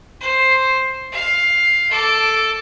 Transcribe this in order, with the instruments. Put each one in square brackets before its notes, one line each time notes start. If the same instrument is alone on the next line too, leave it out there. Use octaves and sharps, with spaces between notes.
[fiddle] C5
F5
A4 D6